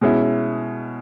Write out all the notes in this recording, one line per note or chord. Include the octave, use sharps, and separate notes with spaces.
B2 G#3 C#4 E4